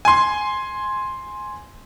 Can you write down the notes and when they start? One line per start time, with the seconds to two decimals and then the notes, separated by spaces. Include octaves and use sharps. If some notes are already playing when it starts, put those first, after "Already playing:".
0.05 G#5 C6